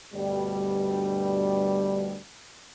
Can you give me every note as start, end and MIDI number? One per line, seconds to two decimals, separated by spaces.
0.14 2.16 38
0.14 2.16 43
0.14 2.16 47
0.14 2.16 55